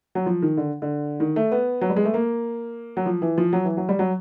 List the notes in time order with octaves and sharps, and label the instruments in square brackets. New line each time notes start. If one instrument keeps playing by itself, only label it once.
[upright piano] F#3
F3
D#3
D3
D3
D#3
A3
B3
F#3
G3
G#3
A3
A#3
F#3
F3
E3
F3
F#3
E3
F#3
G3
F#3